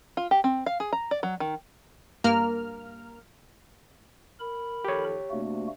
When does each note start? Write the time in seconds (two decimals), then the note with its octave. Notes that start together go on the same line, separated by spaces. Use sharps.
0.17 F4
0.31 G4
0.44 C4
0.66 F5
0.80 G#4
0.93 A#5
1.11 D5
1.23 F#3
1.40 D#3
2.24 G2 A#3 A#4 F6
4.40 A#4 B5
4.85 D#3 F3 G4 A4 C#5
5.31 C3 A3 A#3 D4 F#4